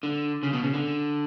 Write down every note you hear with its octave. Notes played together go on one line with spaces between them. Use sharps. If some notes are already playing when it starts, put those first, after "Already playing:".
D3
C#3
B2
C#3
D3